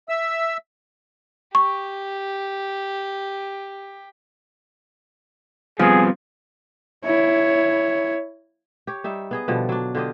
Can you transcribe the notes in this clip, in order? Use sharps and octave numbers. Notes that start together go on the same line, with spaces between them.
E5 E6
G4 C#6
F3 G3 B3 C4 G#4
E4 C#5
G4 C#5
G3 D#4 E5
B3 G#4 D#5
B2 D3 F3 G3
F#3 D4
D3 F4 G4 D#5